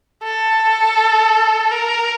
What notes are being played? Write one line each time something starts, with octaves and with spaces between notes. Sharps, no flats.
A4
A#4